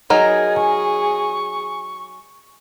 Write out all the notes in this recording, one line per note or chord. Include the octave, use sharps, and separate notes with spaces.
F#3 D#4 G#4 A#4 D#5 G#6
G#5 C#6